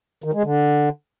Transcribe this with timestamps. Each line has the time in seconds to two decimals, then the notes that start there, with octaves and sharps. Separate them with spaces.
0.24 D#3
0.33 G#3
0.43 D3